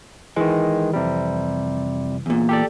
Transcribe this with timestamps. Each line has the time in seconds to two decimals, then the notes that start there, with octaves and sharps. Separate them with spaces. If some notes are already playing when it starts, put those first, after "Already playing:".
0.36 D#3 E3 G#3
0.93 F2 C3 G3
2.26 E2 A#2
2.49 G4 A4 D5